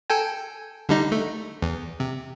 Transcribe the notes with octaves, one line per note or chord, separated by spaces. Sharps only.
A4 G5 G#5
D3 G3 D#4
A3
E2
C3